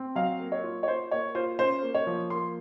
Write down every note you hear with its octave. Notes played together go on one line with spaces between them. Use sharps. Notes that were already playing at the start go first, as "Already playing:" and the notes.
Already playing: C4
F#3 F5
A#3
C#5
F4
C#5
F4 C5
A#3 C#5
F4 C5
C#4 C5
A#3
C#5
F3
A#3 C6